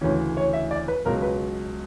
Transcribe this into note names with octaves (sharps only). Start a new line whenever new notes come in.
D2 C#3 E3 C#4
C#5
E5
D5
B4
C#2 B2 F#3 A#4
B4